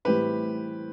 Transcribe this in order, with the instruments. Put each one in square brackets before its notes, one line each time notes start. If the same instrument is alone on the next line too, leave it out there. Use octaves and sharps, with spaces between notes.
[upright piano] A2 E3 G3 C4 G4 B4